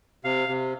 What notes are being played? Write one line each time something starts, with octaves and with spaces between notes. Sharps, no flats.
C3 F5
C3